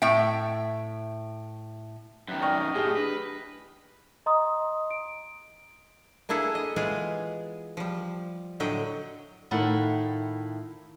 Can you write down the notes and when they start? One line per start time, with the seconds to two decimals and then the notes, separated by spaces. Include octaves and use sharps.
0.02 A2 E5 G5
2.28 F#2 D#3 B4
2.41 D5 D#5 G5 C#6 F6
2.75 A2 G4 G#4
2.96 D4 B4
4.26 D#5 A#5 C6 D#6
4.91 D7
6.29 A#3 D4 E4 G#4 A4
6.55 D#5
6.76 E3 G#3 B3 F4 G#4
7.77 F3 G3
8.60 A2 D3 F#3 D#5 G5
9.51 A2 D#3 E4 F4 F#5